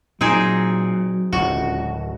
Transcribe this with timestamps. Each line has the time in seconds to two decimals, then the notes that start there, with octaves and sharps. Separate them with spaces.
0.21 A#2 F#3 C4 D#4 G#4
1.33 D1 C#2 F#4